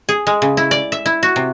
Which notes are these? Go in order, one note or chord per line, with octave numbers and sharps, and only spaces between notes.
G#4
G#3
C#3
E4
D5
E5
E4
F#4
C3